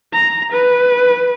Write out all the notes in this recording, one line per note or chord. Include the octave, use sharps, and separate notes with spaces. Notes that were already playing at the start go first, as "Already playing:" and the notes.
A#5
B4